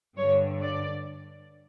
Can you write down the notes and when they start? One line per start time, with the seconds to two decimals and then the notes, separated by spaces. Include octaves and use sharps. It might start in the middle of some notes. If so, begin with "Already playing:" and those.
0.17 G2 D3 C#5
0.62 D5